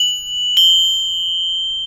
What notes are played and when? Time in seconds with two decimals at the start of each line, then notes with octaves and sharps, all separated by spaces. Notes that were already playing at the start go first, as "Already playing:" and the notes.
Already playing: F#7
0.57 G7